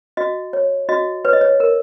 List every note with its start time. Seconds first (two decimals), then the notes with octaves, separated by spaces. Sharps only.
0.17 F#4 D#5
0.53 C#5
0.89 F#4 D#5
1.25 B4 C#5
1.33 D#5
1.41 C#5
1.60 A#4